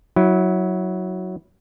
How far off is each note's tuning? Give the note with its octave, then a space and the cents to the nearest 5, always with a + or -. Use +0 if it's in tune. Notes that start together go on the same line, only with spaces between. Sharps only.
F#3 +0 E4 -20